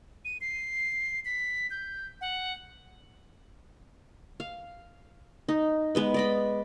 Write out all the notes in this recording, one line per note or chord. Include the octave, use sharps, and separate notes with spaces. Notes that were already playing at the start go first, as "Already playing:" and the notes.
D#7
C7
B6
G6
F#5
F5
D#4
G#3 B3 B4
D5 D#5 B5